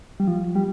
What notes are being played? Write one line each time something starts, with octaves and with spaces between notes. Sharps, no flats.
G3
F3
G3